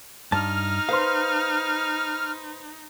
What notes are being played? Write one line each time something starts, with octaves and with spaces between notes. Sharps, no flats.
G2 D#4 A5 F6
B4 C5 F5 C6